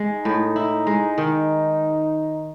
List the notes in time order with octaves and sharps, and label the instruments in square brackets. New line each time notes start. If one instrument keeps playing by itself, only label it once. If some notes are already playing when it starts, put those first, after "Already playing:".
Already playing: [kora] G#3
[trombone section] D#4
[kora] A2
E4
G#3
D#3